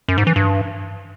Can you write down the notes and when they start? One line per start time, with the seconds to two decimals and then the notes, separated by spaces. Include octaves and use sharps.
0.08 F#2
0.18 G#2
0.27 E3
0.36 G2